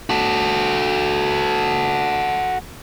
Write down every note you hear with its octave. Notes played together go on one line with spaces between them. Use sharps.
F#4 A4